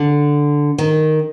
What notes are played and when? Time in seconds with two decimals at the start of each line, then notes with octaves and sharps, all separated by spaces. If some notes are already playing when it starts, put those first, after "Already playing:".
Already playing: D3
0.78 D#3